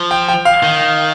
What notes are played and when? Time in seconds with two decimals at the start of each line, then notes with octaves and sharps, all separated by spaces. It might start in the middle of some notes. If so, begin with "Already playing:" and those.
Already playing: F3
0.11 G5
0.28 G5
0.45 F5
0.63 D#3